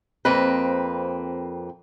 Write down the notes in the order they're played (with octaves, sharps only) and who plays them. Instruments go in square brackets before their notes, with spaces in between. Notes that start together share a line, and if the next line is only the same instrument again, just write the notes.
[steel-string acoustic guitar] F2 A#3 C4 B4